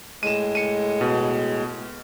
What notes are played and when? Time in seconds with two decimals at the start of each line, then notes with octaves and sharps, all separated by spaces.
0.23 A2 G#3 D#7 E7
0.55 C#7 D#7
1.01 B2